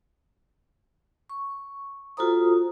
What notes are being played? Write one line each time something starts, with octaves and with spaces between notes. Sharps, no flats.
C#6
F4 F#4 A4 C5 A#5 D#6